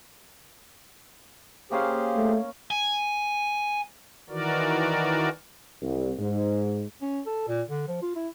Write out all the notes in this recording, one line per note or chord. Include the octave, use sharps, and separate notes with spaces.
A#3 C#4 G4 G#4 C5 F5
A3
G#5
D#3 E3 F#4 A#4 D5
C2
G#2
C#4
A4
A#2
D3
F3
F4
E4